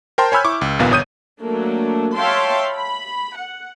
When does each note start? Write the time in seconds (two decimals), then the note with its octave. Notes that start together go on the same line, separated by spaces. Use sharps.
0.18 A#4 C5 G5 A5 C6
0.32 C#5 G#5 B5 E6 F6 G6
0.45 E4 C#6 D6
0.61 C#2
0.79 A#1 D#2 A#2 B3 F5
0.91 G1 C#5 D#6 G6 D#7
1.41 F#3 A3 A#3 D4
2.15 C#5 E5 F5 G5 A5 C6
2.69 B5
3.37 F#5